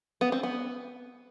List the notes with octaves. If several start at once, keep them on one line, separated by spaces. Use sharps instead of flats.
B3
C4
B3